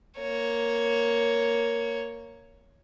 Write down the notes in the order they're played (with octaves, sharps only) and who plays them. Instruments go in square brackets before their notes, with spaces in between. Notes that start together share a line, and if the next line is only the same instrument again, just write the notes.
[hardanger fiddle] A#3 C#5